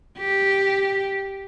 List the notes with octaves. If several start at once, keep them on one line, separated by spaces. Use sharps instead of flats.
G4